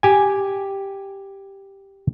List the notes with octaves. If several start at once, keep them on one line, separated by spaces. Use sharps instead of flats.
G4 G#5